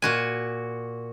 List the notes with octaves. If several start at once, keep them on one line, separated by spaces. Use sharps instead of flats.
A#2 F#4 G#5